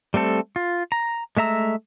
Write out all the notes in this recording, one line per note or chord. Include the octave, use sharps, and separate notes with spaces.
G3 A3 C4 A4
F4
A#5
G#3 A3 E5 A#5 E6